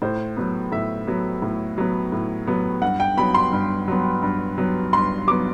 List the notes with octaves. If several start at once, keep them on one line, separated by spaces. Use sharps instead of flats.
A2 C5
F#3 B3
A2 E5
F#3 B3
A2
F#3 B3
A2
F#3 B3
G2 F#5
G5
F#3 B3 B5
C6
G2
F#3 B3
G2
F#3 B3
G2 C6
F#3 B3 D6